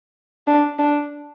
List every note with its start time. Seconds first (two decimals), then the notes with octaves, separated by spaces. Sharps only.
0.47 D4
0.79 D4